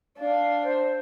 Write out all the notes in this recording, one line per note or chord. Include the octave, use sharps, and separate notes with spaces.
D4 F5
C5